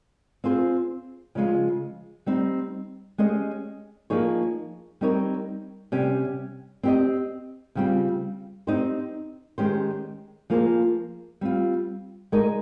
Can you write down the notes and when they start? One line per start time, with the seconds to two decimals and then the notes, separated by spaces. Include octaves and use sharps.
0.44 C4 F4 G#4 C5
1.35 C#3 F3 G#3 C#4 F4
2.26 G3 C4 D#4
3.18 G#3 C#4 G4 C5 D#5
4.10 F3 A#3 D#4 G#4 C#5
5.01 G3 C4 D#4 A#4 C#5
5.92 C3 G3 C#4 G4
6.83 C4 G4 C5 D#5
7.75 C#3 G3 C4 F4
8.67 C4 D#4 G4 C5
9.58 D#3 G#3 C#4 G4 C5
10.50 F3 A#3 F4 G#4 C5
11.41 G3 C4 F4
12.32 G#3 D#4 A#4 D#5